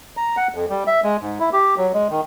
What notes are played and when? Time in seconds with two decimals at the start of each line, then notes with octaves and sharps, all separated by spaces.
0.17 A#5
0.37 F#5
0.55 F2
0.70 G3
0.87 E5
1.04 G#3
1.22 G#2
1.40 E4
1.53 G4
1.78 F#3
1.94 G#3
2.10 D#3